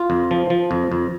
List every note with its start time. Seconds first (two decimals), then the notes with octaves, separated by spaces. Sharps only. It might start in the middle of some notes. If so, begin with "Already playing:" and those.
Already playing: F4
0.10 F2
0.31 F3
0.50 F3
0.71 F2
0.92 F2